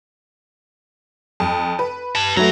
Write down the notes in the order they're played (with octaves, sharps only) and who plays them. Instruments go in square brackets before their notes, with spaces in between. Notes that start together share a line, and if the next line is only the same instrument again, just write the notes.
[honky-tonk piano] F2
B4
[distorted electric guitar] G4 A5
[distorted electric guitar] F#2 A#5 [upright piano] F#3 A3